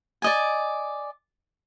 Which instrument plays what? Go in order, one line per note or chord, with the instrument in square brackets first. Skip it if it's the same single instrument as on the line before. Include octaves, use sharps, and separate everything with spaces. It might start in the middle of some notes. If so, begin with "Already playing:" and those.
[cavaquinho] D5 D#5 G#5